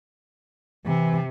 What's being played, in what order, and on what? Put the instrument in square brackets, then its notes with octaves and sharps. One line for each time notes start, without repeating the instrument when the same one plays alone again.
[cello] C3 [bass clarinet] E3